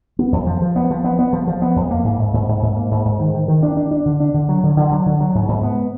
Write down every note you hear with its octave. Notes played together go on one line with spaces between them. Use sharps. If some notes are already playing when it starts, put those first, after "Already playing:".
B3
F2
F3
F3
B3
F3
B3
B3
F3
F3
B3
F2
A#3
G#2
G#2
G#2
G#2
G#2
A#3
G#2
G#2
D#3
D#3
D#3
D4
D4
D4
D3
D4
D3
F#3
D3
D3
F#3
D3
F#3
G#2
G#2
B3